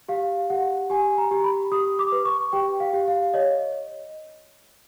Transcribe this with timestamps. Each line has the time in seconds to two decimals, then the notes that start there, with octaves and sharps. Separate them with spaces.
0.08 G4 F5
0.50 G4 F#5
0.90 G4 G#5
1.18 A#5
1.31 G4
1.44 B5
1.72 G4 D#6
1.99 D6
2.12 B4
2.25 C#6
2.53 G4 G5
2.80 F5
2.93 G4
3.08 F5
3.34 C#5 D#5